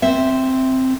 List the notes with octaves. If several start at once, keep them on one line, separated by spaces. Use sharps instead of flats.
C4 E5